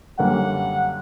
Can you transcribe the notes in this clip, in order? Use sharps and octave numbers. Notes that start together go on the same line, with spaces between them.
F#2 D3 G3 A#3 C#4 F#5